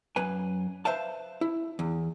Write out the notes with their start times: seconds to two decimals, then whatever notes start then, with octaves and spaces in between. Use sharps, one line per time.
0.16 F#2 B4 G#5
0.85 B4 C5 E5 F5 A5
1.41 E4
1.79 E2